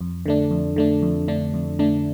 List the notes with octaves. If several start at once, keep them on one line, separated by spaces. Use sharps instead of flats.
F2
D3 A3 D4
F2
D3 A3 D4
F2
D3 A3 D4
F2
D3 A3 D4